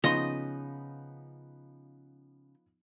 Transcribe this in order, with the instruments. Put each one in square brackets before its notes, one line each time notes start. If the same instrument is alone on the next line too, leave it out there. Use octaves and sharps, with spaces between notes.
[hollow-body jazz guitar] C#3 C6 [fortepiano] F3 B3 D#4 [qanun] D#5